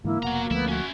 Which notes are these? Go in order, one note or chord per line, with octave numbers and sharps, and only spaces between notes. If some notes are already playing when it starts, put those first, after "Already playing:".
G#2 D3 E3 A#3 E4
F1 B2 F#4 F#5 A#5
D2 F3 A3 B3 E4
C#4 E4 F#4